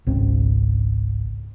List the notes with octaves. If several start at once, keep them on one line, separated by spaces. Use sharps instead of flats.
G#1 C#2 C4